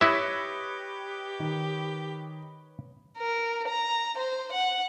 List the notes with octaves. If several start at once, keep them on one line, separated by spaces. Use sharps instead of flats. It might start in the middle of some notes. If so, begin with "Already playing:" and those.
E4 G4 B4 C#5 D#5 E5
D#3
A#4
A#5
C5
F#5